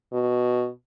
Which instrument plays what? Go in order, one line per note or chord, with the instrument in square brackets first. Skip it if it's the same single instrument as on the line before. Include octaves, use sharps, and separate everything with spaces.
[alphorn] B2